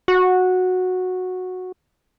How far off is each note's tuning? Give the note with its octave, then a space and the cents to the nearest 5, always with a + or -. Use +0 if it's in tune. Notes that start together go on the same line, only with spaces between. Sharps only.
F#4 -10